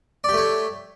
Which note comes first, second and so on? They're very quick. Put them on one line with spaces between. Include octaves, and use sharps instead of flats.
D5 G4 A3 C#5